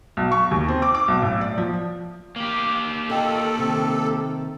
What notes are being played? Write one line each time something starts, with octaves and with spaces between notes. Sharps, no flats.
B1
C#6
D#2
C4
D6
D6
B1
A2
D5
F3
A#3 G4
F4 A4 D#5 G5
C3 D#3 C4